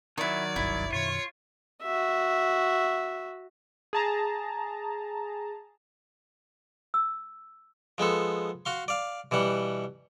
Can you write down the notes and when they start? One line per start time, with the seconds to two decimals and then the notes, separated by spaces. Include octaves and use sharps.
0.18 D#3 F#3 D#4 E4 D5
0.56 F#1 C2 G2 E4
0.93 F#2 B2 D#3 F4 C#5
1.83 F#4 E5
3.93 G#4 A5 A#5
6.94 E6
7.98 F3 G#3 B3 A4
8.66 F#4 F5 C6
8.88 D5 F5
9.31 B2 E3 G3 F#5